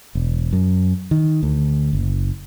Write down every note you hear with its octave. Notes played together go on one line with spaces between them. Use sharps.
E1
F#2
D#3
D2
F#1